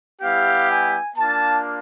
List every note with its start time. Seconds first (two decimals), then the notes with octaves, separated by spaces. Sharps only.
0.22 G3 B3 E4 G4 F5
0.68 G#5
1.16 A#3 D4 F4 A5